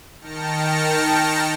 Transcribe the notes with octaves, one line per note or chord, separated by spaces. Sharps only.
D#3 G5 A5 F6 A#6 C#7